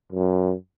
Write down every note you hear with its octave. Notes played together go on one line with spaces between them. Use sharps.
F#2